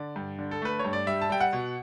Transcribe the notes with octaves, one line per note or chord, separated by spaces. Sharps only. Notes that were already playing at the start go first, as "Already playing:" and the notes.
Already playing: D3 D5
G2
D3
A4
A3 B4
C#5
G2
D5
G3 E5
A5
G3 G5
F#5
B2